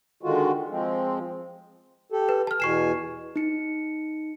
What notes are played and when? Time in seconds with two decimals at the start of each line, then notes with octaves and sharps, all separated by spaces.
0.23 D3 D#3 G#3 F4 F#4
0.70 F3 G#3 C4
2.12 G4 A4
2.29 B4
2.47 A5 F6
2.60 E2 B2 G#5 C#6 C7 E7
3.36 D#4 C#7